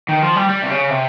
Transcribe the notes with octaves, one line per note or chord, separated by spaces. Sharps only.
D#3
F3
G3
G3
C3
C#3
C3